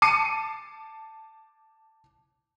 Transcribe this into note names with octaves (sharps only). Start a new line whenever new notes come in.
A5 D6 C7 C#7 D#7